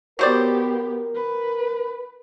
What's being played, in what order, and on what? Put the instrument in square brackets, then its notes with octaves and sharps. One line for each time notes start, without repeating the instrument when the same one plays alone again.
[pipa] F#3 C5 D5 [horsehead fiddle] B3 G4 [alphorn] A#4
[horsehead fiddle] B4